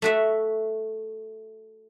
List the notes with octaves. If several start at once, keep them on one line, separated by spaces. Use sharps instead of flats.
A3 F#4 E5